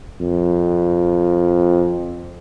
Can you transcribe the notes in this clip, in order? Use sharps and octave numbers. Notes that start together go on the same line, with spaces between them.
F2